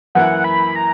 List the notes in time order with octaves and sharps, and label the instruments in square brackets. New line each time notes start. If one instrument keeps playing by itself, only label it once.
[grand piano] F#2 E3 A#3 E4 [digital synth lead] F#5
[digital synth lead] B5
A#5